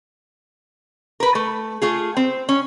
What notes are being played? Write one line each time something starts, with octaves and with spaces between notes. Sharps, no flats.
A#4 B4
A3
A3 F4 G#4
C4
C#4